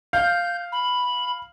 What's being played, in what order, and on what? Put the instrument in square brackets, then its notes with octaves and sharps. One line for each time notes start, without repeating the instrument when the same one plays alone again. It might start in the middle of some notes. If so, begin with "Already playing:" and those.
[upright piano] F5 [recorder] G6
[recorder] B5